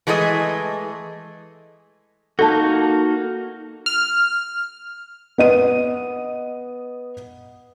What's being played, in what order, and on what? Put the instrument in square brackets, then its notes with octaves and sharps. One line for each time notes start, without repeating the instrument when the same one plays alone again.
[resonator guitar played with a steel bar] E3 G#3 A3 D#4 D#5
[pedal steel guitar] A#3 D#4 F#4 [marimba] A4 A5
[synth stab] F6
[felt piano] B3 D#5 D#7